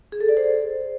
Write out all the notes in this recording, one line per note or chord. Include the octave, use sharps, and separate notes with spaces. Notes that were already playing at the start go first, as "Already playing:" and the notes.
G#4
A4
D5
C5